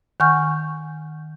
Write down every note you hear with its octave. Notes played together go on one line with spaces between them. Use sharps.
D#3 F#5 G#5 C#6 F6 G6